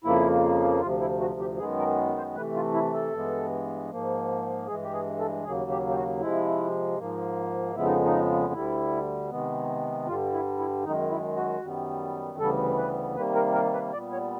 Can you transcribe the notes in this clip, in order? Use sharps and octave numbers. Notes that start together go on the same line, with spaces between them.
F2 C#3 F3 A#3 E4
D2 C3 F3 F4
E4
F#4
G4
F#2 D#3 G#3 B3 G#4
A#4
C5
C3 E3 A3 B4
F4
E4
A4
G2 E3 G#3 B3
G#2 F3 A#3
G2 E3 G#3 G#4
G4
G#4
A4
D#2 C#3 F#3 A#3 G#4
G4
G4
F#4
C3 F3 G#3 E4
G#2 F3 A#3
F2 C#3 F3 G#3 B3 E4
D#4
D#4
D2 D3 G3 E4
C3 D#3 G#3 B3
G2 D3 G3 F4
E4
E4
F#2 D#3 G#3 D#4
E4
F#4
F#2 D#3 G3 B3
D2 C#3 E3 G3 B3 A4
B4
C3 D#3 G3 A#3 B4
A#4
A#4
B4
A#2 G3 B3 D5
C#5